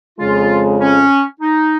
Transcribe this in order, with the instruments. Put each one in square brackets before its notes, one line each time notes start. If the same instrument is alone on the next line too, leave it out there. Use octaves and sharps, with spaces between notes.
[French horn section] F2 C#3 G#3 [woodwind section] F4
[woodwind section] C#4
D#4